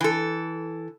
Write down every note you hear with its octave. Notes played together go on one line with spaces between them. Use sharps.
E3 A4